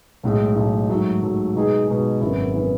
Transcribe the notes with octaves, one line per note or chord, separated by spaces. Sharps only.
B1 A2 G#3
B1 A2 G#3
G#2 F#3 A3
G#2 F#3 A3
B2 G#3 D#4 G#4
B2 G#3 D#4 G#4
G#1 F#2 E3 B3 E4
E3 B3 E4